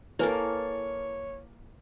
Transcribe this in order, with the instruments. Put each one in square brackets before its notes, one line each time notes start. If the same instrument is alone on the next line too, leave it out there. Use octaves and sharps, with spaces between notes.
[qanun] A#3 A4 [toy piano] E4 B4 G#5 [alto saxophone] C#5